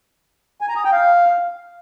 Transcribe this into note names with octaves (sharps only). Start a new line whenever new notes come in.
G#5
A#5
D#6
G5
F5